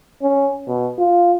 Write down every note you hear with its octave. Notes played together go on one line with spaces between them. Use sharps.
C#4
B2
F4